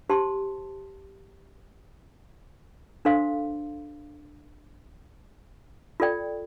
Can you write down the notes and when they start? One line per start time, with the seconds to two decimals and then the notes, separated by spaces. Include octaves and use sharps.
0.10 G4 C5 A5 C6
3.05 D4 A4 C5 F5 C6
6.00 F4 A4 D5 G5